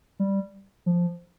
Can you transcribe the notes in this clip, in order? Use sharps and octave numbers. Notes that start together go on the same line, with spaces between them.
G3
F3